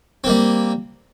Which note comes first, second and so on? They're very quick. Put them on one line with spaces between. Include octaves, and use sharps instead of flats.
C4 A#3 G3